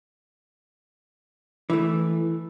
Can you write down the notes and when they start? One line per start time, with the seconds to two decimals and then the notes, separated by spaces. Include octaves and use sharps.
1.70 E3 A3